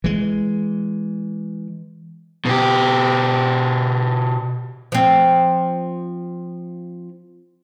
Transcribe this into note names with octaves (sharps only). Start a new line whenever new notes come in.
E3 G#3
B2 G4
F3 C4